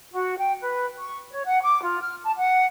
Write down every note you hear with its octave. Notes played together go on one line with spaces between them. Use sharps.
F#4
G5
B4
C#6
C#5
F#5
D6
F4
F6
A5
F#5